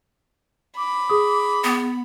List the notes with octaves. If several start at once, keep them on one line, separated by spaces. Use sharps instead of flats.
B5 D6
G#4 D#6
B3